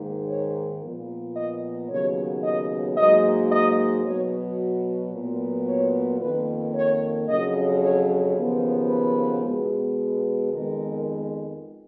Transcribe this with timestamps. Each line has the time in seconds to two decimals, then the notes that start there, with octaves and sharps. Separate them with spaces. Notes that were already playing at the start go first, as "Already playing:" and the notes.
Already playing: G#2 D#3 A#3
0.29 C#5
0.82 A#2 F3 B3
1.36 D#5
1.90 D#2 C#3 F#3 B3 C#5
2.44 D#5
2.98 G#2 F#3 A#3 D#5
3.52 D#5
4.05 B2 F#3 B3 C#5
5.14 A#2 F#3 B3
5.67 C#5
6.21 F2 D#3 A#3 B4
6.75 C#5
7.29 F2 C#3 F#3 D#5
7.83 C#5
8.37 D#2 C#3 F3 B3
8.90 B4
9.44 B2 G#3 B3
10.53 F2 D#3 G#3 B3 A#4